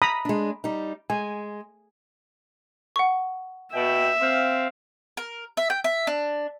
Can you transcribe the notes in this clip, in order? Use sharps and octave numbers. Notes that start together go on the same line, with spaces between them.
A#5 B5 D#6
G#3 D4
G3 D#4
G#3 G#5
F#5 C#6
B2 E5 G5
C4 F5
A#4
E5
G5
E5
D4